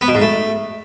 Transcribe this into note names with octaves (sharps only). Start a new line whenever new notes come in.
B3
B2
G#2
A3